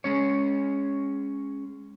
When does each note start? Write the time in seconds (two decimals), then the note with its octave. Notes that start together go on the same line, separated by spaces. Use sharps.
0.04 G#3 C#4 C#5